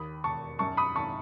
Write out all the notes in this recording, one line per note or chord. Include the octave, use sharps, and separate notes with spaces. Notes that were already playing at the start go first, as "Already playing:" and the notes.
Already playing: D#2 B5 D#6
E1 A5 C#6
F#2 A5 C#6
B5 D#6
G#1 A5 C#6